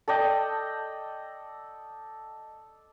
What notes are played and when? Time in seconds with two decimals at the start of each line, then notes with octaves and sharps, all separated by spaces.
0.08 A4 D5 D#5 G5